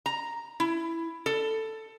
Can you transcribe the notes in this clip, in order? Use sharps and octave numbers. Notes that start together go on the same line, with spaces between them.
A#5
E4
A4